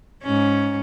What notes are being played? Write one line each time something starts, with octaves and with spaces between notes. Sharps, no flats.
G#2 C#4